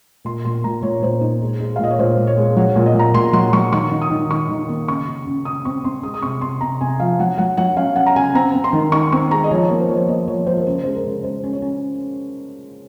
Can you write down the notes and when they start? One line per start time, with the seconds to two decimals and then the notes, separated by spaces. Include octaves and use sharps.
0.25 A#2 C6
0.45 A#2 C6
0.64 A#2 A#5
0.83 A#2 C#5
1.03 A#2 C5
1.21 D#4
1.41 G#3
1.60 G#3
1.76 F5
1.79 A#2 D#5
1.90 C#5
1.99 A#2 C5
2.17 A#2
2.27 C#5
2.38 G#3
2.57 F#3 C#5
2.76 A#2
2.86 D#5
2.95 A#2 A#5
3.14 A#2 C6
3.33 F#3 C6
3.53 F#3 C#6
3.72 D#3 C#6
3.91 D#4
4.02 D#6
4.10 D#3
4.30 D#4 C#6
4.49 D#3
4.69 A#3
4.88 C#3 C#6
5.07 C#3
5.26 C#3
5.45 C#3 D#6
5.65 C4 C#6
5.85 C4 C6
6.03 G#3 D#6
6.14 D#6
6.23 C3 C#6
6.41 C3 C6
6.61 C3 A#5
6.81 C3 G#5
6.99 F3 F5
7.19 F#3 F#5
7.38 F#3 F#5
7.57 F#3 F#5
7.76 C#4 F5
7.96 C#4 F#5
8.06 A#5
8.16 C#3 G#5
8.35 C4 A#5
8.54 C4
8.64 C6
8.73 D#3
8.92 D#4 C#6
9.12 C4 C#6
9.31 G#3 A#5
9.44 D#5
9.51 F3 C#5
9.70 A#3
9.80 C5
9.89 F3 C#5
9.97 C5
10.08 A#3 D#5
10.28 F3 C#5
10.47 F3 C5
10.57 A#4
10.66 C#3 C5
10.84 G#3 C5
10.95 A#4
11.04 C#3
11.23 G#3 C5
11.44 C#4
11.53 C#5
11.62 C#4